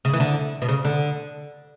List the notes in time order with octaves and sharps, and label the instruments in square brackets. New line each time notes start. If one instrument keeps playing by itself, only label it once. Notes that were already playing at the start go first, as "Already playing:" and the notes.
[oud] C#3
E3
D3
B2
C#3
D3